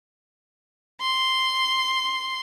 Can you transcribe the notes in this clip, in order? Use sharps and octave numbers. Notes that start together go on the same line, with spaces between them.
C6